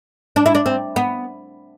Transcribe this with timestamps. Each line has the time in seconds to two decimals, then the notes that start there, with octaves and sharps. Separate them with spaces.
0.36 D4
0.46 E4
0.55 D4
0.66 C4
0.96 B3